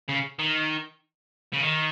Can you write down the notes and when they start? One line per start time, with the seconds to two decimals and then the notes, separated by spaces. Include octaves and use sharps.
0.09 C#3
0.39 D#3
1.53 C#3
1.61 D#3